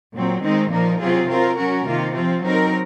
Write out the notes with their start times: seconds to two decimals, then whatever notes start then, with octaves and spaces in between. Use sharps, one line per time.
0.13 A#2 F#3 C4
0.42 D#3 G#3 C4 D#4
0.70 A#2 F3 A#3 D#4 A#4
1.00 C3 F#3 C4 F4 G#4
1.27 F#3 C4 F4 A#4
1.56 F#3 C#4 F#4 A#4
1.85 C3 D#3 A#3 F4
2.14 F3 C4 F4
2.42 F#3 C4 D#4 A#4